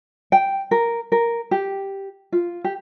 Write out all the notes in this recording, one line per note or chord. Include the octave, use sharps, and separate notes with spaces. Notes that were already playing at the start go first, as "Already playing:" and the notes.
G5
A#4
A#4
G4
F4
G4